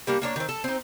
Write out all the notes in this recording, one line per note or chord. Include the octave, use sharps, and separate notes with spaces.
G3 A#3 D4
A#3 D4 C#5
D#3 C4
A4
C4 D#4